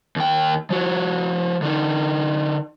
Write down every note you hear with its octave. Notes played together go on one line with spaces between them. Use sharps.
D#2 G5
F3 F#4
D3 D#4